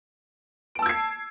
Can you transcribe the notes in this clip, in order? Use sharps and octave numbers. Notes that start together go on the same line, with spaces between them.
A5 E6 G#6 C7 D7